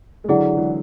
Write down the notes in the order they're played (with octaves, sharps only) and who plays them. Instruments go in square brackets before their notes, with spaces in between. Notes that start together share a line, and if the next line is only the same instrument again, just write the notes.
[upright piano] G#3
[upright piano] D3 F#3 [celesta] E4 G#4 D5 F#5
[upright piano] E3 G#3